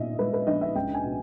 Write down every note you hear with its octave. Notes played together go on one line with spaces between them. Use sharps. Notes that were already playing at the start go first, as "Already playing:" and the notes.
Already playing: A#2 C#4 D#5 E5
G#3 B4
B4
A#1 D#5
E5
C#2 G5
G#5
B2